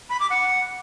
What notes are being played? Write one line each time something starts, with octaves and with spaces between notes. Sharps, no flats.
B5
D6
F#5